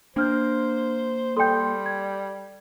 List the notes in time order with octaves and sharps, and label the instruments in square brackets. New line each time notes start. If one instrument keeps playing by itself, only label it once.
[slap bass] A#3 [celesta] D4 F6 G6 [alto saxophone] C5
[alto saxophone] G3 [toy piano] A4 G5 [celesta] C6 G6
[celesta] G#6